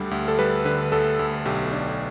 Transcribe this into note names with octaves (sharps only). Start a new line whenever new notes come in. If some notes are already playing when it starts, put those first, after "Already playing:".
Already playing: D2 D3 G3 G4
D2
A4
G3 B4
D3 B4
D2 A4
D2
B1 G4
D4